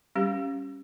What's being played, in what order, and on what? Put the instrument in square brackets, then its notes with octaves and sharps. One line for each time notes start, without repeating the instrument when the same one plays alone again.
[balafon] G3 C#4 G4